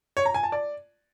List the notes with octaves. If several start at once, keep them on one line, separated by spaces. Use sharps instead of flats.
C#5
A#5
G#5
A5
D5